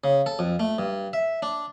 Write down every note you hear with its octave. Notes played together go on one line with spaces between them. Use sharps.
C#3
A4
F2
A3
G2
E5
D4